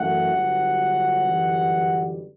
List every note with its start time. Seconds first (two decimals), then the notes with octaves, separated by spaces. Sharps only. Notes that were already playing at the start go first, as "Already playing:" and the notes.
Already playing: F#2 E3 A3 F#5
0.31 G1 G2 F#3
1.26 G1 F#2 E3 G3